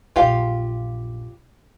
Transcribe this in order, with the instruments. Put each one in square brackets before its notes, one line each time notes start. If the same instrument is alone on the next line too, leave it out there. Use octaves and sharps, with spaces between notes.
[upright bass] A#1 F#2 [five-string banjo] F4 G4 F5